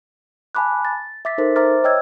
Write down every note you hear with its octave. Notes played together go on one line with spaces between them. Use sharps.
G#5 A5 B5 D6 F#6
A6
E5 D6 A6 B6
D#4 A4 A#4 C5
C5 E5 A#5 D6 F6 A6
C#5 D#5 G5 E6 F6 G#6